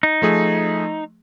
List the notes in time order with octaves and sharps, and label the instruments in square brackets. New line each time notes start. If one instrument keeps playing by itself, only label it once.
[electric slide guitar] D#4
[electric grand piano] F3 A3 G#4